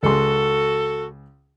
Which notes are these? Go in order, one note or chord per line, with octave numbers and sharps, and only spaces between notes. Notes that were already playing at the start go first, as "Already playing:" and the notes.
C#2 F#4 G#4 A4 C6